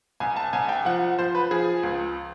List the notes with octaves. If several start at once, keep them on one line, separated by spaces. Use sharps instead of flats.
C2 G#5
A5
C2 G#5
G5
F3 F#5
F3 C5
B4
F3 G#4
C#2